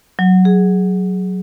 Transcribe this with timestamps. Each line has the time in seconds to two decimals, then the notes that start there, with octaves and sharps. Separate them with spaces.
0.19 F#3
0.45 G#4